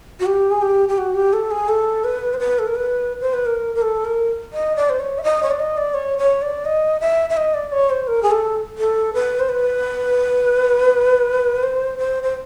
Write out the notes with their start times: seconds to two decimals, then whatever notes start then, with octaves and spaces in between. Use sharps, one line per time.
0.20 F#4
0.26 G4
0.51 G#4
0.62 G4
0.89 G4
0.98 F#4
1.15 G4
1.33 A4
1.51 G#4
1.69 A4
2.04 B4
2.33 C5
2.39 B4
2.59 A4
2.67 A#4
2.75 B4
3.21 C5
3.34 B4
3.46 A#4
3.75 A#4
3.82 A4
4.05 A#4
4.53 D#5
4.76 D5
4.90 C5
5.00 C#5
5.18 E5
5.24 D#5
5.43 C#5
5.51 D5
5.59 D#5
5.77 D5
5.94 C#5
6.18 C#5
6.42 D5
6.65 D#5
7.00 E5
7.30 E5
7.37 D#5
7.54 D5
7.72 C#5
7.90 C5
8.08 A#4
8.23 G#4
8.31 A4
8.78 A4
9.14 B4
9.40 C5
9.49 B4
11.63 C5
11.98 C5
12.23 C5